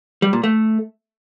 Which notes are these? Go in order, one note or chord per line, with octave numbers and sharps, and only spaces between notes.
G3
A#2
A3